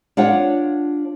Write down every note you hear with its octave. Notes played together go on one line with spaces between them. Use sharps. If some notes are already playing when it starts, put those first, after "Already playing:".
D4 F4 C#5 F#5